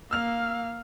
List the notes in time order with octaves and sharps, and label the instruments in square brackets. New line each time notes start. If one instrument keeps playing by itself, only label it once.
[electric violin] A#3 F5 [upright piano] E6 F6 F7